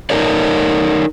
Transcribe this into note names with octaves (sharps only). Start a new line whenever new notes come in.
D#4 F4 A4 A#4 C#5 D5